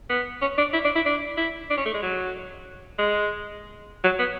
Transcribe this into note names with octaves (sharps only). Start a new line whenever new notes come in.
B3
C#4
D4
E4
D4
E4
D4
E4
D4
C#4
A3
G#3
F#3
G#3
F#3
B3